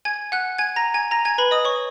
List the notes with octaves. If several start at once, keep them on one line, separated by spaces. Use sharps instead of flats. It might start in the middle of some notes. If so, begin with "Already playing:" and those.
G#5 G#6
F#5 F#6
G#5 G#6
A#5 A#6
G#5 G#6
A#5 A#6
G#5 G#6
B4 B5
D#5 D#6
C#5 C#6